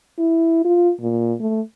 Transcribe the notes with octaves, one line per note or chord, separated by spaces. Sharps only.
E4
F4
A#2
A3